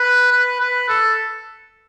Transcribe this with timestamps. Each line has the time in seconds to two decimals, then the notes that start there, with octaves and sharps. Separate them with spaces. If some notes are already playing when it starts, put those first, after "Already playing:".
Already playing: B4
0.32 B4
0.60 B4
0.89 A4